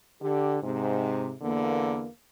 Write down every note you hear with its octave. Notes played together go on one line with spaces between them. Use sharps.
D3 G4
G#2 C3
E2 D3 A#3